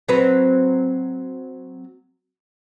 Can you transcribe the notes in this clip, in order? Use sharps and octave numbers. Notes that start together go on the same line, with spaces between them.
F#3 C4 B4